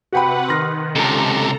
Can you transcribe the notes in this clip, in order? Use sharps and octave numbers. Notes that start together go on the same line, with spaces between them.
C3 F#4 B4 F#5 G5 B5
D#3 C6 F6 A#6
C#2 C3 A4 A#5